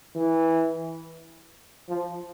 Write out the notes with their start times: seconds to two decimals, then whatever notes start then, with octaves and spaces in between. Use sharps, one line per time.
0.15 E3
1.89 F3